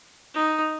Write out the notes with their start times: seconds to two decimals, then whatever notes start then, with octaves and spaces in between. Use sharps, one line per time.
0.34 D#4